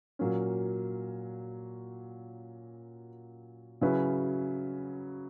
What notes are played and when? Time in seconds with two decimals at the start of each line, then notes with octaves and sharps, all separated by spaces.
0.19 A#2 F#3 A#3 C#4
3.81 C#3 F#3 C#4 E4 B4